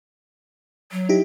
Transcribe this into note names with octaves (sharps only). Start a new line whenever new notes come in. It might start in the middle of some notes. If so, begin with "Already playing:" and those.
F#3
D#4 E4 G4